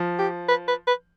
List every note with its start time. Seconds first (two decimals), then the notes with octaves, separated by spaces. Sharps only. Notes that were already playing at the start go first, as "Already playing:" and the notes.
Already playing: F3
0.19 G4
0.48 B4
0.68 B4
0.87 B4